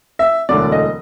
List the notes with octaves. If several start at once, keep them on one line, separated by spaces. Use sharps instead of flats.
E5
E1 D2 D3 F#3 D5
D#5